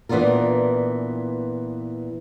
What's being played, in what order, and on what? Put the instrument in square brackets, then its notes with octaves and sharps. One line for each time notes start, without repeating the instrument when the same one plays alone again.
[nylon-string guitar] A#2 E3 B3 D4 F4 A#4